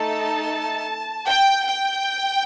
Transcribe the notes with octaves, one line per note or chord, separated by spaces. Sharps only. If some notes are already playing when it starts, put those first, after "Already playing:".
Already playing: A3 D#4 A4 A5
G5
G5